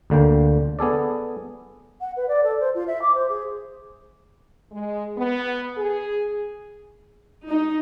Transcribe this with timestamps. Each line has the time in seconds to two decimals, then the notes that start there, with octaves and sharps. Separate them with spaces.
0.10 D2 D3 A#3 G5
0.79 B3 G#4 A4 D5
2.01 F#5
2.16 B4
2.28 D5
2.43 A4
2.60 C5
2.75 F4
2.87 E5
3.02 D6
3.14 C5
3.29 G#4
4.71 G#3
5.16 B3
5.76 G#4
7.47 D#4